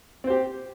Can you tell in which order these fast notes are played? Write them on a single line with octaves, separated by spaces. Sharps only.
C4 C5 G4